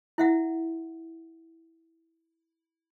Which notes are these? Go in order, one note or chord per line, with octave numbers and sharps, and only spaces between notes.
E4 E5 F#5